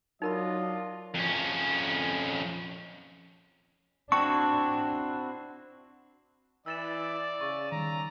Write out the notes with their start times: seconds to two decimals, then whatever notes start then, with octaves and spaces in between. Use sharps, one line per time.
0.22 F#3 D4 D#4 F4 A#4 D#5 B5
1.15 F2 C#4
4.12 C4 D4 E4 F#4 A5 C#6
6.66 E3 D5 E6 A6 E7
7.41 C#3 C#6
7.72 D#3 G3 A#5